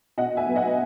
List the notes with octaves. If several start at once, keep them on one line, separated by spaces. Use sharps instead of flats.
B2 D#5 F#5
E5 G#5
F#3 B3
D#5 F#5